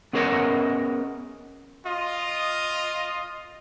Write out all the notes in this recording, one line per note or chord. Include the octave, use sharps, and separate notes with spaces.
B3 C#4 G#4 A#4 D#5 F#5
F4 D#5